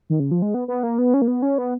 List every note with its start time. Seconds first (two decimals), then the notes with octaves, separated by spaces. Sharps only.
0.10 D#3
0.20 C#3
0.31 F3
0.42 G#3
0.54 B3
0.68 B3
0.83 A#3
0.98 B3
1.14 C#4
1.22 A#3
1.28 B3
1.42 C#4
1.58 B3